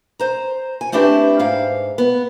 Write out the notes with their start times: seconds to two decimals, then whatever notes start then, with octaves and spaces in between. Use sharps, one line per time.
0.19 C5 A#5
0.81 G#5
0.92 A3 C4 D4 E4 G4 B4
1.39 G#2 F5
1.98 B3